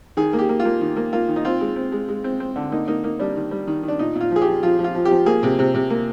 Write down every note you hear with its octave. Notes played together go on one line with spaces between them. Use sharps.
D#3 G#4
A#3
G4
A#3
F4
A#3
D#3
A#3
A#3 F4
D#3
D#4
C4 F4
G#3
C4
G#3
G#3
C4
C4
D3
A#3 D#4
A#3 D#4
A#3 D#4
G3 D4
D#3
G3
D#3
D#3
D4
A#2 D#4
A#2
F4
F3 G#4
G4
F3
F3 F4
F3
F4
F3
G4
F3
A#3 G#4
C3
C3
C3
A#3